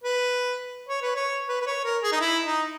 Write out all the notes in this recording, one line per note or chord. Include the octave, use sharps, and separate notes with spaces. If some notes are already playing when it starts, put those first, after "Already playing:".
B4
C#5
B4
C#5
B4
B4
C#5
A#4
G#4
D#4
E4
D#4